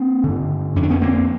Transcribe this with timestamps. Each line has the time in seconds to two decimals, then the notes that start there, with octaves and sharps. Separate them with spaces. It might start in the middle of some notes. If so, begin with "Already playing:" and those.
Already playing: A#3 C4
0.24 G2 D3
0.76 F2 C#4
0.80 D3 D4
0.90 B3 C#4
1.02 A#3 C4